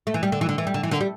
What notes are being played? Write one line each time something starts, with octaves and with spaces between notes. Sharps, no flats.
A3
E3
G3
D3
E3
D3
E3
G3
D3
E3
D3
G3